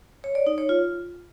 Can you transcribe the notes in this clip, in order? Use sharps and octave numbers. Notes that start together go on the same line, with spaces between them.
C#5
D5
D#4
C#5
F4